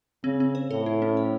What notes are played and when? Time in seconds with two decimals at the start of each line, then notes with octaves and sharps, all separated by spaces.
0.24 C#3 C4
0.40 C4
0.55 C5
0.71 A2 A4
0.86 E4
1.02 C#4
1.17 C#5